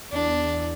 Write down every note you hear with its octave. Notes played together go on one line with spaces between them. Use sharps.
E2 D4